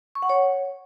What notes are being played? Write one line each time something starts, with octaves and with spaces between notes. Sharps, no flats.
C#6
F#5
C#5